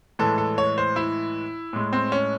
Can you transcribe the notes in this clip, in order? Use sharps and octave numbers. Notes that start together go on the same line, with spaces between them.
A2 E3 G#3 A4
A4
C#5
C5
E4
A2 G#3
C4
C#4